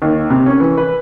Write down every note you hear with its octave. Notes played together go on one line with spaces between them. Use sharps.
D#2
C3
C#4
E3
B4